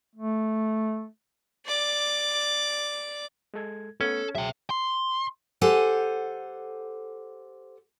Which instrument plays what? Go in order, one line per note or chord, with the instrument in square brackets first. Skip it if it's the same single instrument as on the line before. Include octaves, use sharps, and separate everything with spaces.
[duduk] A3
[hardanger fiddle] D5 D6
[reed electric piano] G#3 A4 G#6
[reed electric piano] A3 B3 [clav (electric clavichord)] C#4 [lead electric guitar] A4
[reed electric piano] C#2 F#3 G#4 [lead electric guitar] E5 G5
[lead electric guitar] C6
[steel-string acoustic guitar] G4 A4 C5 F#5 G#5